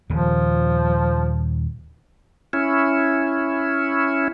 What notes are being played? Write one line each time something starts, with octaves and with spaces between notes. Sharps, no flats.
D#1 D#2 C#3 F3
C#4 E4